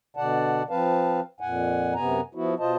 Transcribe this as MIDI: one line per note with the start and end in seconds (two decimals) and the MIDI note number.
0.17 0.63 47
0.17 0.63 50
0.17 0.63 74
0.17 0.63 78
0.17 0.63 81
0.70 1.20 53
0.70 1.20 60
0.70 1.20 71
0.70 1.20 77
0.70 1.20 81
1.41 1.94 41
1.41 1.94 46
1.41 1.94 78
1.41 1.94 80
1.95 2.21 42
1.95 2.21 48
1.95 2.21 59
1.95 2.21 80
1.95 2.21 82
2.35 2.54 53
2.35 2.54 59
2.35 2.54 64
2.35 2.54 66
2.59 2.77 47
2.59 2.77 65
2.59 2.77 72
2.59 2.77 75
2.59 2.77 81